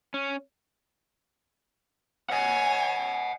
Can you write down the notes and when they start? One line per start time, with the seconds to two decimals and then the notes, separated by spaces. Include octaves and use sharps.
0.14 C#4
2.30 C#5 D#5 F#5 G#5